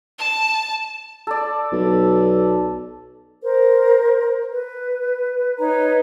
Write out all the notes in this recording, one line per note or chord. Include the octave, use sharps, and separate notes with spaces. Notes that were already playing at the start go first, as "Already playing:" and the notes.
A5
A4 D5
B1
A#4 C5
B4
D#4 B4 C#5 A#5